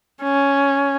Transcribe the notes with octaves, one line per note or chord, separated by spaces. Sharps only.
C#4